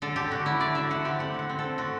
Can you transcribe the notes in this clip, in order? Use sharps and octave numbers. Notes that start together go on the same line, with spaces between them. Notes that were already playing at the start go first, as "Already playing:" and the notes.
D3 A4
D3 G4
D3 F#4
D3 E4
D3 D5
D3 E5
D3 F#5
C4 G4
A3 F#5
D3 F#5
C4
A4
D3
D3 F#4